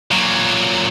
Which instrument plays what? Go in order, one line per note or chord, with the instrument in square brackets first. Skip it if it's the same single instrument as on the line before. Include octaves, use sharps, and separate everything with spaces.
[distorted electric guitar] A#2 F#3